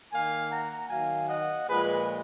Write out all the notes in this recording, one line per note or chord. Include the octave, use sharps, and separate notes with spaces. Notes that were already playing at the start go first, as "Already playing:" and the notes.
D#3 A#3 F5 G#5
F#5 A#5
D#3 F#3 A#3 F5 G#5
D#5 F#5
A#2 F3 G#3 G#4 B4